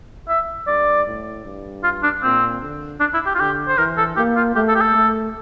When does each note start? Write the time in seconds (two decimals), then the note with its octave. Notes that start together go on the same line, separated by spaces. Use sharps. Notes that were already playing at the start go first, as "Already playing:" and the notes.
0.28 E5
0.67 G2 D5
1.07 A2
1.45 G2
1.84 F4
2.03 D4
2.23 A#2 C4
2.62 D3
3.00 D4
3.14 E4
3.26 G4
3.35 F4
3.39 D3 G4
3.68 C5
3.78 E3 A#4
3.98 A4
4.17 A#3 G4
4.36 F4
4.56 A3 G4
4.69 A4
4.75 G4
4.81 A4
4.95 A3